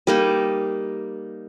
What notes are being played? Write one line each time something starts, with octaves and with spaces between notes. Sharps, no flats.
G3 A#3 D#4